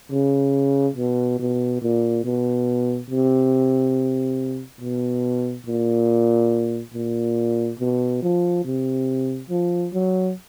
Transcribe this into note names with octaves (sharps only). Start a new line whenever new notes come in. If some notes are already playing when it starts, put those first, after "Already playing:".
C#3
B2
B2
A#2
B2
C3
B2
A#2
A#2
B2
F3
C3
F3
F#3